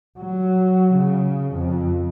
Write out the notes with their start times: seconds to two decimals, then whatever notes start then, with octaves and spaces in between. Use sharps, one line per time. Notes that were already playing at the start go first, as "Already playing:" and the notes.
0.20 F#3
0.95 C#3
1.53 F2